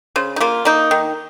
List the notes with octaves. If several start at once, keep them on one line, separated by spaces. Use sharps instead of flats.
C#3 C5
D#4
A#3 F4
A#3 D#4
D#3